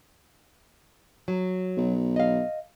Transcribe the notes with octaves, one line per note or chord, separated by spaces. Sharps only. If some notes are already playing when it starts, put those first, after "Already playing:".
F#3
B1
D#5 F5